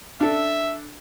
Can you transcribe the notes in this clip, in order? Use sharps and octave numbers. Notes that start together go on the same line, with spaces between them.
D4 A4 E5